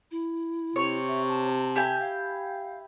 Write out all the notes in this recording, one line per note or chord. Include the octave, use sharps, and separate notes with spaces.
E4
C3 C#5
E5
A5
E4 G4 G#5
F5